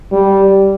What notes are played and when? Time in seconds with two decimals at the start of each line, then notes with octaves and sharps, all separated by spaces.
0.12 G3